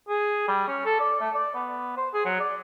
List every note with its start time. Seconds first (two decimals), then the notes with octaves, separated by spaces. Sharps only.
0.09 G#4
0.48 G3
0.68 C#4
0.85 A4
1.00 D5
1.21 A3
1.34 D5
1.55 B3
1.97 C5
2.14 G#4
2.25 F#3
2.40 D5